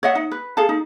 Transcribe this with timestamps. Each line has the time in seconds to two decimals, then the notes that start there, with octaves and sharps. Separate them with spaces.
0.03 C#5 D#5 E5 F#5
0.15 D#4
0.32 B4
0.57 G#4 A4 F5 A5
0.69 D#4